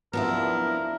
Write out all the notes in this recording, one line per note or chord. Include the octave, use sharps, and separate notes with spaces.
C2 F#2 F3 B3 D4 E4 A#4